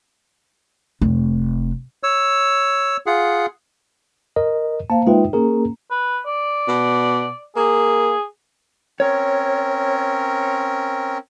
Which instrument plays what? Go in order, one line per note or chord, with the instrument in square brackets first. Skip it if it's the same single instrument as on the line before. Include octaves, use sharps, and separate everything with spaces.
[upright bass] F1
[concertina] C#5 E6
F4 G#4 F#5
[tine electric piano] A#4 D#5
[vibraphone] A#3 C5 F5 [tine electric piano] A5
[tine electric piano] G#3 F4 B4 [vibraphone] D#4 E5 G5
[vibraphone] A#3 C#4 A#5 [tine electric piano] G#4 A#4
[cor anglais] B4
D5
[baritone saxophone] B2
[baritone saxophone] A#3 [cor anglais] G#4
[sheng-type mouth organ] C4 C#4 A#4 [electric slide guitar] C#5